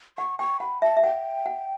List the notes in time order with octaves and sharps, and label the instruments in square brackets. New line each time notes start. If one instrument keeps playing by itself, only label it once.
[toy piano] F#5 [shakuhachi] C#6
[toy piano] G5 [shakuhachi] C#6
[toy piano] F#5 [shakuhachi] B5
[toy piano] E5 [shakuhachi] A5
[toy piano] E5
[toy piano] F#5 [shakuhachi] G5
[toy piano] F#5